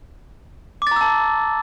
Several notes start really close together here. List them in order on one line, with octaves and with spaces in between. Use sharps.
D6 A6 A#5 E6 A5